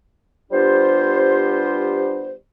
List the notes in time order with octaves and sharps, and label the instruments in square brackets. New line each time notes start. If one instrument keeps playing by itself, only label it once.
[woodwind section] G3 B3 D4 F4 G4 C5